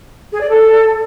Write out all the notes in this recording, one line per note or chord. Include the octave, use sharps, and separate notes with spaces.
G#4
D5
A4